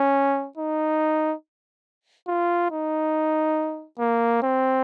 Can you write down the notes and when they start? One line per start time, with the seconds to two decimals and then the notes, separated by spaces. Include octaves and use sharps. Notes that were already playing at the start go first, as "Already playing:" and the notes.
Already playing: C#4
0.57 D#4
2.28 F4
2.71 D#4
3.99 A#3
4.42 C4